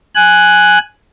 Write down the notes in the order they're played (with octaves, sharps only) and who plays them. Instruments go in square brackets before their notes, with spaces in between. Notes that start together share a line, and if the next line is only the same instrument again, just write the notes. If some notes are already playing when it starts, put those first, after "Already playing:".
[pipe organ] G#5 F#6